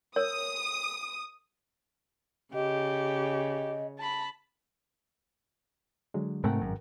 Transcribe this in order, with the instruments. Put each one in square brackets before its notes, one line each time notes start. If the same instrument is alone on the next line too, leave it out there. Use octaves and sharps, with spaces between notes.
[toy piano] A#4 C#5 [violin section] D#6
[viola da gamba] C#3 [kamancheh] G4 [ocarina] D#5
[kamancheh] A5 B5
[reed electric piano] D3 F#3 G#3
[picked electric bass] G#2 C3 A3 [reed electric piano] A#4 F#5 G5
[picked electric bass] G#1 F#2